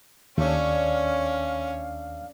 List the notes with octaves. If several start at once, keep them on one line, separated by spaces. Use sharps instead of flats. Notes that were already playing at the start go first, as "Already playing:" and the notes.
D#2 A3 C#4 D4 C#5 F5